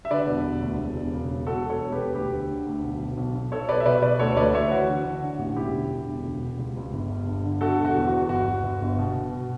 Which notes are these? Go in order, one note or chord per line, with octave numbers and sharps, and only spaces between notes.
E5
D3 B4 D5
E1
E1
D2
E1
E1
C#3
E1
E1 F#4 A4
E1
A4 C#5
E1
G4 B4
E1
D2 G4 B4
D3
D3
D2
B1
B2
B1
B1
B1 A4 C#5
B1 B4 D5
E5
B2 B4 D5
B2 B4 D5
D2 A4 C#5
D2 B4 D5
D2 C#5 E5
E3 F#4
D3
D3
D3
A1
E1 E4 G4
D3
D3
E1
C#2
B2
C#2
C#2
G1
G2
G1
D3
D3 F#4 A4
E1
F#4
E2
E2 F#4
G1 F#4
G1
G1
G1
B2
B2
B2